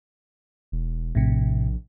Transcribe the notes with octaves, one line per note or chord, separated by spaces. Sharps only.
E1
A#1 A2 C3